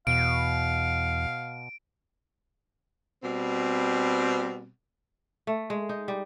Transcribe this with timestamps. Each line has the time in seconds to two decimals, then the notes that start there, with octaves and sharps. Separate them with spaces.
0.07 E2 B2 F5 D7
3.24 B2 G3 C4
5.47 A3
5.70 G#3
5.89 D#4
6.08 G3